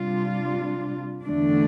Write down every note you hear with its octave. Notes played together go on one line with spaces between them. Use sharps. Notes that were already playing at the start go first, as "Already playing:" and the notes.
Already playing: C3 G3 D4 F4
E2 D3 A3 D4